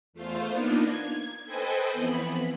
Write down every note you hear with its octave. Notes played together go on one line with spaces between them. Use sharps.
E2 A3 F4 C5 F5
A#3 B3 D4 D#4 F4
G#6
A4 B4 C5 D#5 G5 G#5
F2 E3 B3 B5